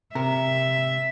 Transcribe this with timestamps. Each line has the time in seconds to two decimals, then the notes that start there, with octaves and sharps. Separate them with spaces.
0.15 C3 A#4 E5